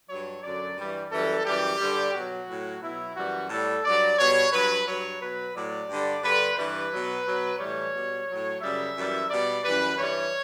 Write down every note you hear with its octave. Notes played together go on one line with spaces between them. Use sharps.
F#3 C#5
G2
F#2 D3 F#3 D5
G2 E3 G3
F#2 E3 G3 A4
F#2 E3 G3 G4
G2 D3 G3
B2 F#3 F#4
A2 F#3
B2 F#3 E4
F#2 E3 G3 F#4
A2 G3 A4
G2 F#3 D5
B2 G3 C#5
G2 F#3 B4
G2 F#3 C#5
B2 F#3 B4
A2 F#3 D5
G2 D3 G3
G2 D3 G3 B4
G2 E3 G3 B4
B2 F#3
B2 F#3
A2 E3 G3 C#5
B2 G3
A2 F#3
F#2 C#3 G3 E5
F#2 E3 G3
B2 G3 D5
F#2 E3 G3 B4
G2 E3 G3 C#5